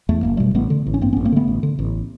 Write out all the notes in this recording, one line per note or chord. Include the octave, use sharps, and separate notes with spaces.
E2 A3
F#1 A#3
B2 G3 A3
A1 A3 B3
D3
A1
C#4
G2 A#3 C4
A1 B3 C#4
A#3 C4
D3 A3 B3
A1
D3
A1